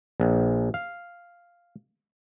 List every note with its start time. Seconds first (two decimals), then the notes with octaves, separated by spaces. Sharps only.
0.20 A#1
0.74 F5